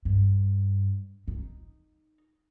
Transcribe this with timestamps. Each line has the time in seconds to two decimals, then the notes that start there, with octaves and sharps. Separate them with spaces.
0.05 G2
1.28 D#4